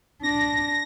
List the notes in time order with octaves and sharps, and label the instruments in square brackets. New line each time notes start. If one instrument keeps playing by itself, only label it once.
[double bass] D4 [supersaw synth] A#6